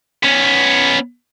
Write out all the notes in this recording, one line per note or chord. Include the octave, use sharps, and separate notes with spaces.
B3 C#4